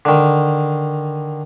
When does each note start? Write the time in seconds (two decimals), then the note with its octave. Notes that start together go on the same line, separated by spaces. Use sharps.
0.05 D3 D#3